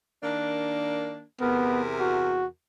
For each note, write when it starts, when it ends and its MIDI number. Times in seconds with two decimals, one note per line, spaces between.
0.22 1.22 51
0.22 1.22 58
0.22 1.22 62
1.41 2.47 40
1.41 2.47 48
1.41 1.81 59
1.41 2.47 70
2.00 2.45 66